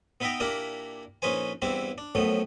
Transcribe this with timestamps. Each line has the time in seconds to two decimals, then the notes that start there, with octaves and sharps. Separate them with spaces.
0.20 B3 D#4 B4 E5 G5 A#5
0.40 A#2 A#3 D4 E4 G4 A#4
1.22 A#1 C#4 D#4 B4 C5 G#5
1.62 E2 G2 G3 C4 E4
1.98 D4
2.15 F#2 A2 F3 A3 B3